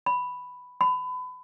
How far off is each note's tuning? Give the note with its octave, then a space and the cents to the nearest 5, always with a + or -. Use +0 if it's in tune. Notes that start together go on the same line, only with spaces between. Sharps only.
B5 +5
B5 +30